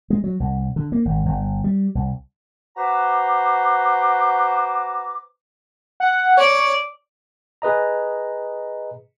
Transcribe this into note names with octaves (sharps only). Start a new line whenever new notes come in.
G#3
F#3
C2
D3
A#3
G#1
G1
G3
C2
F#4 B4 C5 A#5 D6
F#5
C#5 D5
G#4 B4 D#5 A#5